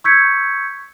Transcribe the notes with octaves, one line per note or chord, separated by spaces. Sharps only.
C#6 E6 G6 G#6 B6 C#7